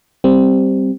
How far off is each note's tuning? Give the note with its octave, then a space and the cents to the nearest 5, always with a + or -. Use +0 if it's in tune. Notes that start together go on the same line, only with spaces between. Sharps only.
G3 +0 C4 +0